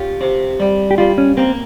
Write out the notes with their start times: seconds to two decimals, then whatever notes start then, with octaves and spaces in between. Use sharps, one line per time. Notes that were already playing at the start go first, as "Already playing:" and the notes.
Already playing: C#4 F4 G4
0.21 C3
0.60 G3
0.91 G4
0.98 G3 F4
1.18 C#4
1.37 A#3 C4